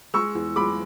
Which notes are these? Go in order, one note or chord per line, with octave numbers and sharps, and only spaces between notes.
G#3 C#6 E6
E2
G#3 B5 D6